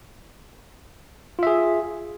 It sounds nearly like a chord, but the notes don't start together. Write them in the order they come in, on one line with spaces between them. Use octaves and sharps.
F4 E5 G#4